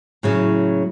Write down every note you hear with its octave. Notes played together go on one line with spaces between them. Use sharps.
A2 C#3 F#3